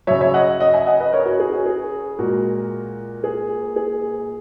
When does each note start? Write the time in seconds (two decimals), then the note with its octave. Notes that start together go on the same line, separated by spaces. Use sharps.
0.07 C#3 F#3 C#5 E5
0.21 C#5 E5
0.34 D#5 F#5
0.60 D#5 F#5
0.74 E5 G#5
0.86 D#5 F#5
1.00 B4 D#5
1.12 A#4 C#5
1.26 F#4
1.40 G#4
1.52 F#4
1.66 G#4
2.19 A#2 G#3 F#4 A#4
3.24 G#4
3.76 G#4